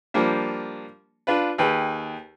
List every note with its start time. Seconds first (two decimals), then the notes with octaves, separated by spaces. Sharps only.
0.14 F3 G3 A#3 D4
1.27 D4 F4 B4
1.58 D#2 G#4 B4 G5